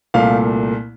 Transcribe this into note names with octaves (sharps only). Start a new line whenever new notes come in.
C2 A#2 A3 F5